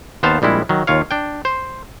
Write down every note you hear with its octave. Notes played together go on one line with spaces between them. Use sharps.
D#2 B3 C5 F5 A5
A#1 G3 G#3 E4
D#3 F#3
D#2 F4 C#5 F5
D4 G5
C5